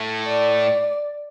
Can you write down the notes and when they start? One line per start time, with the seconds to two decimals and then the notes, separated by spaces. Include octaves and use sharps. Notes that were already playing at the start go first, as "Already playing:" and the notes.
Already playing: A2 A3
0.28 D5